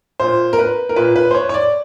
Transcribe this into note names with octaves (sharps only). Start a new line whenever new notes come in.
A#2 C5
A#4
B4
A#4
A#2 B4
B4
C5
C#5
C#5
D5